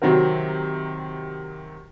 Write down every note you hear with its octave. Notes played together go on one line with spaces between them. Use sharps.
C3 D#3 F#3 C4 F#4 A#4